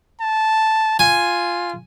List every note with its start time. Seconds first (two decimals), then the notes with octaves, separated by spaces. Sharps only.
0.21 A5
0.99 F4 G#5